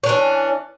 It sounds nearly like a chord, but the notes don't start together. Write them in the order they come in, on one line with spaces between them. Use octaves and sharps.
C#4 D4 E3